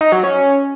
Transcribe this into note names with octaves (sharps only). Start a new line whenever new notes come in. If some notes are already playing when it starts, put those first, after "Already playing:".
D#4
F#3
C#4